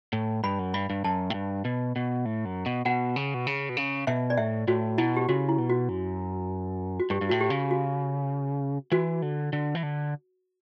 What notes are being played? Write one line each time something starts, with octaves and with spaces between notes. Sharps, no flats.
A2
G2 B5
F#2
G2 B5
G2
F#2 A5
A2
G2
B2
B2
A2
F#2
B2
B2 F#5
C#3
B2
C#3
B2
C#3
B2 E5
D5
A2 E5
A2 F#4
B2 E4
G4
C#3 F#4
E4
B2
F#4
F#2
F#4
G2 G4
G2
A2 F#4
G4
C#3
F#4
E3 F#4
D3
D3
E3
D3